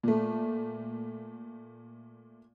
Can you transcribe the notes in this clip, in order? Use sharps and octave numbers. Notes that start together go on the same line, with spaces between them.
A#2 A3